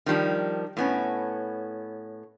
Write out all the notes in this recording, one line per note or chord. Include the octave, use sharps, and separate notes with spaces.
D#3 F3 G3 D4
A2 B3 C#4